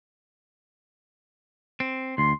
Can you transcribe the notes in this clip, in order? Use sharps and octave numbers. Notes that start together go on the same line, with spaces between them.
C4
D2 C6